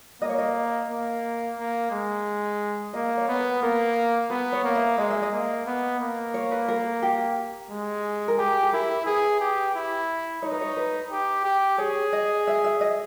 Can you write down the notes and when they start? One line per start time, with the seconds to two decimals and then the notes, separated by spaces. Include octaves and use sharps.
0.22 A#3 D#5
0.30 C#5
0.38 D#5
0.90 A#3
1.58 A#3
1.92 G#3
2.93 A#3 D#5
3.17 C#5
3.28 B3
3.40 B4
3.62 A#3 A#4
4.30 B3 B4
4.52 C#5
4.64 A#3
4.75 E5
4.98 G#3 D#5
5.11 E5
5.22 D#5
5.32 A#3
5.66 B3
6.00 A#3
6.34 C#5
6.51 B4
6.68 A#4
7.03 G4
7.70 G#3
8.28 A#4
8.38 G4 G#4
8.63 G#4
8.73 E4 A#4
9.06 G#4 B4
9.40 G4
9.75 E4
10.42 D#4 C#5
10.52 B4
10.61 C#5
10.77 B4
11.11 G4
11.45 G4
11.78 G#4 C#5
12.13 D#5
12.47 E5
12.64 E5
12.81 D#5